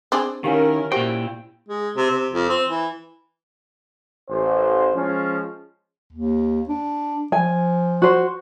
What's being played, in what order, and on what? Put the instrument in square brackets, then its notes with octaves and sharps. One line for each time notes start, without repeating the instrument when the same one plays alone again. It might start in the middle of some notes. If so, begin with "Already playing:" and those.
[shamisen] C4 D4 G#4
[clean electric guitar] D#3 [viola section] C#4 E4 A#4 [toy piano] G4 F5 G#5
[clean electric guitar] A#2 G5 [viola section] E4 [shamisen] F#4 [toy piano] G4 C5
[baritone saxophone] G#3
C3
C3
F2
C4
E3
[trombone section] A1 C5
F3 G#3 C#4
[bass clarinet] D#2
D4
[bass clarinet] F3 [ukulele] G#5
[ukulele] F#4 C5